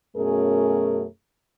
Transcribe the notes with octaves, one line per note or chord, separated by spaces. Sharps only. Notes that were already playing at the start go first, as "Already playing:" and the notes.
F#2 B2 A3 C#4 G#4 A#4